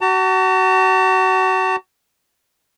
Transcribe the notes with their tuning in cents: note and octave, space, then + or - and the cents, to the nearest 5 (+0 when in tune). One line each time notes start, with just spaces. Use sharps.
F#4 +30 A5 +40